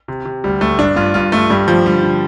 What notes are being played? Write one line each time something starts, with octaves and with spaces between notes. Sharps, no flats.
C3
C3
D2 G3
D2 A3
G2 D4
G2 F4
G2 F4
G2 A3
G2 G3
F3
D3 G3
D3